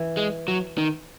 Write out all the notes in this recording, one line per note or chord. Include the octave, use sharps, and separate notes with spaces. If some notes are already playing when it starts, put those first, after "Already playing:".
Already playing: E3
G#3
F#3
D#3